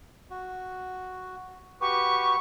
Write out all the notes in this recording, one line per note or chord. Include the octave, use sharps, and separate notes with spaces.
F#4
F#4 G4 B4 C#6